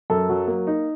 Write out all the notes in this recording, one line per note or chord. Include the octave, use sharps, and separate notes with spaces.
F#2 A4
F#3
A#3
D#4